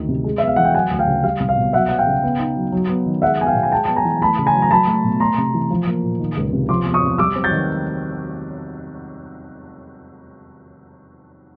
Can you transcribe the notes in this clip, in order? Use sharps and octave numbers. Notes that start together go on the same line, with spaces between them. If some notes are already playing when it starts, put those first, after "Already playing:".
Already playing: D2 D#3
C3
G#3
B3 E5
F5
E3 F#5
G5
F#3 F#5 G#5
D2
F5 G5
C#3
G3 F5
C2
F5
B2
F#3 E5 F#5
B3 F#5
F5 G5
C#3
B3
D#4
F#3
F#3
B3
D#3
G#3 E5 F#5
B3 G#5
F5 G5
B2
G#5
G#3 G5 A5
B3 A5
G#5 A#5
E3
A3 A5 B5
C#3
G#5 A#5
F#3
A#5
F#3 A5 B5
A3
B2
A3 A#5 C6
C3
E3
F3
A#3
A#2
D#3
C#2
C3
F3 C6 D6
E2
C#6 D#6
C3
G3 D6 E6
C4
G6 A6
D#3